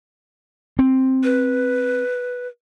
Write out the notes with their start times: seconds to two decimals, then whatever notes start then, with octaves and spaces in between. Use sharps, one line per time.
0.79 C4
1.24 B4